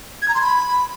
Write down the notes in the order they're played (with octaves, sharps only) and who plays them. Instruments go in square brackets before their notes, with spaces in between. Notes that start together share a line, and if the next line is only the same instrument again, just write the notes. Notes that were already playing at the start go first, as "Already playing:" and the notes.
[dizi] G#6
A#5
C6
B5